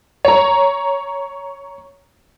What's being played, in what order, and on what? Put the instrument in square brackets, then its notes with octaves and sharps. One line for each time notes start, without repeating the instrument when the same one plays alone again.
[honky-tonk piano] C#5 A#5